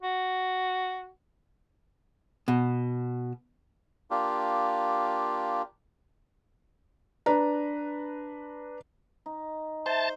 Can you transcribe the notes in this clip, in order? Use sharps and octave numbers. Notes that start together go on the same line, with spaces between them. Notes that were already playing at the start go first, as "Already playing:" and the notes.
F#4
B2
A#3 D4 F4 G4
D4 B4 A#5
D#4
C5 E5 A5